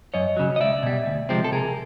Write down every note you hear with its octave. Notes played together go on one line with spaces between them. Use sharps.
F#2 C#5 D#5
C#3 F#3
D#5
C#2 D5 E5
B2 G3
D2
C3 F3 G#3 C4
A4
C3 G#4 A#4